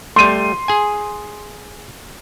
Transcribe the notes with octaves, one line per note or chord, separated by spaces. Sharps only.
G3 A3 C6 D#7
G#4 G#5